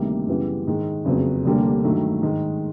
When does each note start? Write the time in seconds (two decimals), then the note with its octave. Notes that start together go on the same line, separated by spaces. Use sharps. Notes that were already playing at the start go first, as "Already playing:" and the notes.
Already playing: D2 C3 D#3 G3 A#3
0.27 F#2 C#3 E3 G3 B3
0.67 G#2 D#3 G#3
1.05 F#1 F2 C#3 F#3 B3
1.45 F1 D#2 D3 G3 A#3
1.84 G2 D#3 F#3 A3
2.22 G#2 D#3 G#3